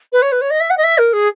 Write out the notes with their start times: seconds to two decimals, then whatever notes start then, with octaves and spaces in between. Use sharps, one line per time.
0.12 B4
0.22 C#5
0.32 B4
0.41 C#5
0.50 D#5
0.60 E5
0.70 F#5
0.77 D#5
0.84 E5
0.98 A#4
1.13 G#4